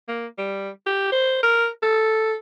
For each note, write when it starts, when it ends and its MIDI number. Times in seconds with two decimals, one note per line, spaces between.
0.09 0.27 58
0.38 0.69 55
0.86 1.08 67
1.12 1.39 72
1.43 1.67 70
1.83 2.35 69